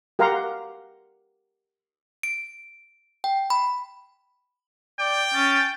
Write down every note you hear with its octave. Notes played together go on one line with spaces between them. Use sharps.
G4 A#4 F5 F#5 A#5 C6
D7
G5
B5
D5 G5
C#4 A6